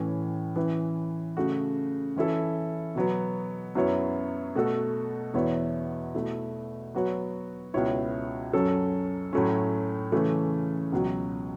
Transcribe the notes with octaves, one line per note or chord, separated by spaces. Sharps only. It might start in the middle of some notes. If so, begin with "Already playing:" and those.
Already playing: A2 E3 C#4
E3 C#4 E4 B4
C#3 A3 F#4
E3 C#4 E4 A4
B2 F#3 B3
F#2 F#3 B3 E4 C#5
B2 A3 F#4 A4
E2 B2 B3 E4 C#5
B2 A3 E4
F#3 B3 F#4 C#5
C#2 B2 B3 E4 C#5
F#2 F#3 C#4 A4 C#5
A2 F#3 A3 C#4
C#3 E3 A3 C#4 A4
C#2 B2 F#3